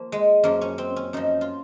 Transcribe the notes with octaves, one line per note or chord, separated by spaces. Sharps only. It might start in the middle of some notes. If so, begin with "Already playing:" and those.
Already playing: F3 A#3
G#3
F#2 F3 A#3
C#4
C4
C#4
F#2 F3 D#4
F4